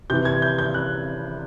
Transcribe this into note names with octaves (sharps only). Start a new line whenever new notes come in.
C3 E3 G6
G#6
G6
G6
F#6